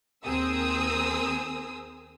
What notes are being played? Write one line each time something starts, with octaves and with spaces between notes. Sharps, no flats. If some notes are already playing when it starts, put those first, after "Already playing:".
D#2 C4 G#4 A#4 D#6 E6